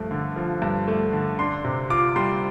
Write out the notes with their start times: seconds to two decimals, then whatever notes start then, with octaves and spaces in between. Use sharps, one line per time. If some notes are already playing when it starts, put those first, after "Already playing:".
Already playing: G2 F3 A3
0.11 D3
0.36 F3
0.62 G2
0.87 A3
1.13 D3
1.39 D4 C6
1.65 C3
1.90 F4 D6
2.16 G3 C6